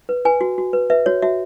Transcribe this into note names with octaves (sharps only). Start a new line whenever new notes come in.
B4
B4 G#5
F#4
F#4
B4
B4 E5
F#4 C#5
F#4 E5